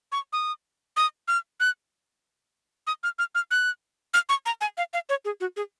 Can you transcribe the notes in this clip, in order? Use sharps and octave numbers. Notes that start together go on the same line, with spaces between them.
C#6
D#6
D#6
F6
F#6
D#6
F6
F6
F6
F#6
F6
C#6
A#5
G#5
F5
F5
C#5
G#4
F#4
G#4